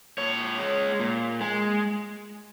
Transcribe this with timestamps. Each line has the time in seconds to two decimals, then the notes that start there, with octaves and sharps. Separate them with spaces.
0.18 A#2 C#5
0.58 G#3
1.00 A#2
1.41 G#3